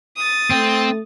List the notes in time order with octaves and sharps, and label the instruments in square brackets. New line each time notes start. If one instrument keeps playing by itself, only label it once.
[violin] D#6 A6
[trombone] A3 [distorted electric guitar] C4